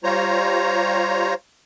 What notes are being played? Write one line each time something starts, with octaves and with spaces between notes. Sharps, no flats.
G3 F4 C5 C#5 A#5